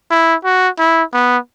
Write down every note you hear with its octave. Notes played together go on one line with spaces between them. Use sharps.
E4
F#4
E4
B3